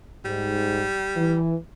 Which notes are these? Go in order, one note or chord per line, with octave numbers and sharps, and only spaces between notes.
G#2 G3
E3